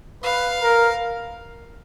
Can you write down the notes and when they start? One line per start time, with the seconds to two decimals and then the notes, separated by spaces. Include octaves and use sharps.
0.23 B4 F5
0.62 A#4